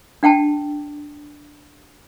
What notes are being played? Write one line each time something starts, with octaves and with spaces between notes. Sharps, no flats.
D4 F#5 G5 A5